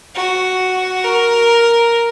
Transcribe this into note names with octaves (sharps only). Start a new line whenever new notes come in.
F#4
A#4